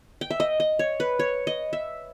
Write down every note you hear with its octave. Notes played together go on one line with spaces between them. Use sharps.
G5
E5
D#5
D#5
C#5
B4
C#5
D#5
E5